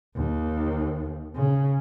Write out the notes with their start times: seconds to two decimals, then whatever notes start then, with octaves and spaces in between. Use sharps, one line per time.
0.16 D#2
1.35 C#3